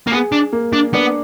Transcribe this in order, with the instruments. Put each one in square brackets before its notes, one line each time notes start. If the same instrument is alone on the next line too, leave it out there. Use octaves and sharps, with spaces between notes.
[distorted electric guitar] A#3
[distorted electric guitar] B3 [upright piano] G#4
[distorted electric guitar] D4
[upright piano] A#3
[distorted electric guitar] D4
[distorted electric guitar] B3 [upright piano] D4